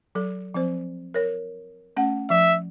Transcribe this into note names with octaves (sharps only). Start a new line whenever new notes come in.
F#3 A4
F3 C4 C5
A#4 C#5
A3 C#4 F#5
F3 E5